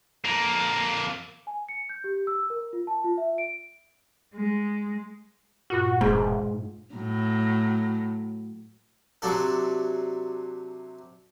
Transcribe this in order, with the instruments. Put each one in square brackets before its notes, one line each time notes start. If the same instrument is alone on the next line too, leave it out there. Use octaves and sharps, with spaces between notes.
[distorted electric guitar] F2 A#3
[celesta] G#5
C#7
G6
G4
E6
A#4
F4
A5
F4
E5
D7
[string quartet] G#3
[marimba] G2 A#2 F4 [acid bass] F#4
[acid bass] E1 [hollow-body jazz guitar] G#2
[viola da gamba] A2 F#3
[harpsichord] C3 F#3 D4 A4